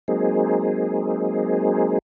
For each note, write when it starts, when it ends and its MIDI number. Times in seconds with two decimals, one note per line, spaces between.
0.08 1.98 54
0.08 1.98 56
0.08 1.98 58
0.08 1.98 60
0.08 1.98 63
0.08 1.98 68